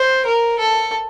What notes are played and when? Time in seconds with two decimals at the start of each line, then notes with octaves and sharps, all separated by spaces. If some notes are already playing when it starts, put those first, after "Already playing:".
Already playing: C5
0.26 A#4
0.59 A4